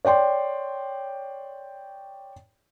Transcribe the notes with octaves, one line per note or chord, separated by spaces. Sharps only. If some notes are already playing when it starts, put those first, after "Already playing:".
C#5 D5 G5 C6